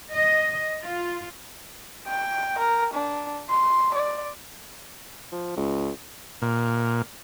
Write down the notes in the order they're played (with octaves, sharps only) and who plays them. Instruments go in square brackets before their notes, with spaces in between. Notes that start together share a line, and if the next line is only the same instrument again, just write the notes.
[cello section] D#5
F4
[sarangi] G5
A#4
D4
C6
D5
[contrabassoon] F3
C#2
[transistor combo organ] A#2